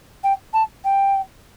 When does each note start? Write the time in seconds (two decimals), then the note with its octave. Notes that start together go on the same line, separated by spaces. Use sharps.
0.23 G5
0.53 A5
0.84 G5